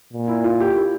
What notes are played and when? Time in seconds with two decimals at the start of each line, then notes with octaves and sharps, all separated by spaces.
0.13 A#2
0.28 E4
0.44 F4
0.60 G4
0.76 E4